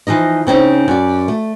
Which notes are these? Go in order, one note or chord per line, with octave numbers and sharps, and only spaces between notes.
E3 F3 D#4 D#5
C#3 C4 C#4 D#4
F#2 D5
A3